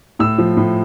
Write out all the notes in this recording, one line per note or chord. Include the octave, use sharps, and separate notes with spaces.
A2 E6
F3
A2